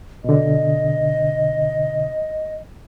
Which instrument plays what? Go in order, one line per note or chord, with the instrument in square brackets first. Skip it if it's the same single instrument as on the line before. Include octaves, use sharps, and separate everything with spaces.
[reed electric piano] B2 D3 [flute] D#5